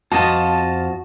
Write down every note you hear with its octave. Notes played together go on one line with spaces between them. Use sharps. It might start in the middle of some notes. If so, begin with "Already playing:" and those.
F2 F4 F#4 D#5 A5